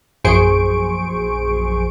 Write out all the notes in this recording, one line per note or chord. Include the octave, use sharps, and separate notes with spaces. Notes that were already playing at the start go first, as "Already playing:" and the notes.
A#1 F#2 G#4 C5 C#6 D7